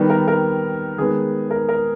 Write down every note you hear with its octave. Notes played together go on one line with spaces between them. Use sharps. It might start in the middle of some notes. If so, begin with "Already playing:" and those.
Already playing: D#3 G3 B3
A#4
A#4
D#3 G#3 B3 G#4
A#4
A#4